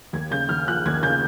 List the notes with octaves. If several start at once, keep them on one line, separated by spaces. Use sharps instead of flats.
D#2 G#6
C#3 G6
D#2 F6
F3 F#6
D#2 G#6
C#3 G6